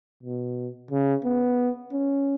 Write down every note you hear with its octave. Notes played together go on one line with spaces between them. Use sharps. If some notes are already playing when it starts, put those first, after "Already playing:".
B2
C#3
B3
C#4